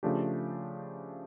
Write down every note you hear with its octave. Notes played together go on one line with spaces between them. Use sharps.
C#3 F3 A3 D4 G4